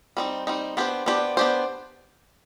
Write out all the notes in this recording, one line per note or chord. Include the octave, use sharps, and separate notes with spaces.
G3 C4 D#4
G3 C4 D#4
B3 D4 G4 C5
B3 D4 G4 C5
B3 D4 G4 C5